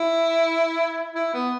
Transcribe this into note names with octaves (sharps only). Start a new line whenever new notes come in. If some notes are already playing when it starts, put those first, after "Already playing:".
Already playing: E4
E4
B3